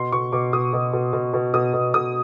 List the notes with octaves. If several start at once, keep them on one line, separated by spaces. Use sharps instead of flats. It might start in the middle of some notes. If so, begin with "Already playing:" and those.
Already playing: B2 C6
B2 C#6
B2 D6
B2 D#6
B2
B2
B2
B2
B2 D#6
B2
B2 D#6